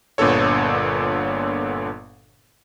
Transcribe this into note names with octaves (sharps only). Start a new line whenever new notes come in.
G1 A#2 D3 B3 A4 C#5